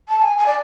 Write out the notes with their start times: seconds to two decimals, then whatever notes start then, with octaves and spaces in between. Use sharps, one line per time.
0.09 A5
0.22 G#5
0.38 G#5
0.46 D5